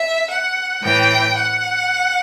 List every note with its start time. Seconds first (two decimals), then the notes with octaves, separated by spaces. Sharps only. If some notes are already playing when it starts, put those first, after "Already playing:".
Already playing: E5
0.29 F#5
0.83 A2 E3 G5
1.37 F#5